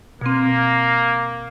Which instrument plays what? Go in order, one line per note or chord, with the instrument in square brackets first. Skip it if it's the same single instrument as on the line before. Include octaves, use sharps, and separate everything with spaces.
[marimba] B2 C4 [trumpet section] A#3